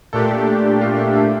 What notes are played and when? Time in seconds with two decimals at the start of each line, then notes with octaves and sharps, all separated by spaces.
0.13 A#2 A3 D4 G4 A4
0.81 F4
0.99 E4
1.15 E4